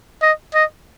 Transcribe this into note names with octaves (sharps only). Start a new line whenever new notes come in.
D#5
D#5